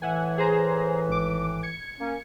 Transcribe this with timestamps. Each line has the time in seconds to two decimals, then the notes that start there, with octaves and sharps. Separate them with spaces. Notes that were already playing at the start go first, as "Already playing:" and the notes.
0.02 A2 E3 E5 F#5 G#5
0.38 G#4 C5 A#5
1.09 G#1 D6
1.63 G#6 C#7
2.00 A#3 C#4